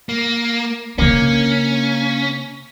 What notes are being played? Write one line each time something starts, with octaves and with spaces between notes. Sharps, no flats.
A#3
C#3 A#3 C#4 D4